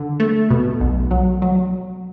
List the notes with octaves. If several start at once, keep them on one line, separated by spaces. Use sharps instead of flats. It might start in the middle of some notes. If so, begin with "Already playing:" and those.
Already playing: D3
A3
B2
B1
F#3
F#3